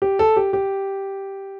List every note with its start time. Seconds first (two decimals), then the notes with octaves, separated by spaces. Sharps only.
0.02 G4
0.19 A4
0.36 G4
0.53 G4